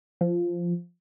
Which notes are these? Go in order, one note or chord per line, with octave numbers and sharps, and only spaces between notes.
F3